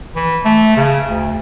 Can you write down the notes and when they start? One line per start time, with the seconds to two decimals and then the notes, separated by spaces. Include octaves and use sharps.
0.16 E3
0.45 A3
0.76 C#3
1.08 D2